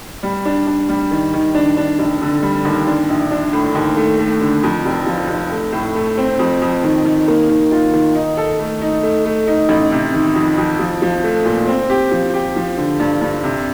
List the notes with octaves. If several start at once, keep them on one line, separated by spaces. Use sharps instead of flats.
G3
D4
D4
G3
D#3
D#3
D4
D4
F1
D3
G3
D#2
D4
A#1
D4
A2
D#2
A3
A3
D3
F2
F1
F3
F1
A3
A2
A3
C4
F2
F2
D#3
D#3
A#3
D#3
F4
D#3
D#4
A4
A3
D#4
A3
A3
D#4
A1
C3
D#3
F2
F2
F3
F3
A3
A#2
C4
G4
F3
G4
F3
D3
G2
G2
C3